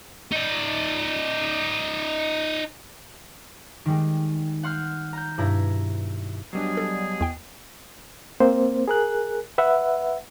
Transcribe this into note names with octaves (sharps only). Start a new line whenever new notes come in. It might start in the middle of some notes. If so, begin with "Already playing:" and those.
D#4 D5
D#3 G3 G#3
F#5 C6 F6 G6
A#5 G6
G2 B2 E4 A#5 G#6
B2 F#3 G3 B3 D4 G#4
A4
E2 G5
A#3 C4 C5
G#4 A#4 F#6
B4 E5 F#5